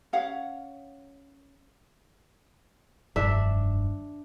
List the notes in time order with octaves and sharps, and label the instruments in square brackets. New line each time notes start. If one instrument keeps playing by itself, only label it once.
[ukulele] C#4 C#5 F5 F#5
[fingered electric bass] F1 G2 D#3 [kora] D4 E5